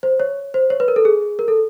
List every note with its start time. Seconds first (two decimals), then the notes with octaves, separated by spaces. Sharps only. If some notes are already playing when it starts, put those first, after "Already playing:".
0.03 C5
0.20 C#5
0.54 C5
0.70 C#5
0.80 B4
0.88 A#4
0.96 A4
1.05 G#4
1.39 A#4
1.48 A4